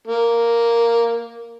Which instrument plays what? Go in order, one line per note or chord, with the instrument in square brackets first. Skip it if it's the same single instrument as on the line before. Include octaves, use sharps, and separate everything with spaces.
[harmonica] A#3